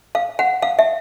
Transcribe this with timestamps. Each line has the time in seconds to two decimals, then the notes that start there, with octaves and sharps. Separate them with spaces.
0.15 F5
0.39 F#5
0.62 F5
0.79 E5